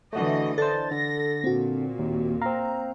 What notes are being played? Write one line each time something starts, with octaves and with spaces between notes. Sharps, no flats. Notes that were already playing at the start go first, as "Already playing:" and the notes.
D3 E3 A3 F#4 D#5
D4 A4 C5 A6
D3 A#6
A#2 C4 F#4
D#2
C4 F5 A#5